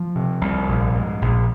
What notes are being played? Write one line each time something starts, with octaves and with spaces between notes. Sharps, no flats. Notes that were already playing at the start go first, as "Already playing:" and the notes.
Already playing: F3
C3
C2
A#1
G#2
A#1